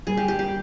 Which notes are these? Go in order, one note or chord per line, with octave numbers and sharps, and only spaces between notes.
A#2 G3 A#3 G#4
G4
G4
G4